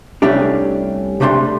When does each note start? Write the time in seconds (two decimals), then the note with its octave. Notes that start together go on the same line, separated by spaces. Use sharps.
0.22 C2 G3 A3 C#4 D4 G4
1.20 C3 G3 A3 D4 G#5 C6